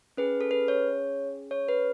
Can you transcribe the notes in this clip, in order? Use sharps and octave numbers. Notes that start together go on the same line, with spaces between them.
C#4 G#4 B4
A4
B4
C#5
C#5
B4